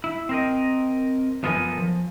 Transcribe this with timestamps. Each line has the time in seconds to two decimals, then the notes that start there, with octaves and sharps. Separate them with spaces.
0.04 E4
0.29 C4 A#4 D#5
1.43 F#2 F3 B3 A4 A#4 G#5
1.78 F3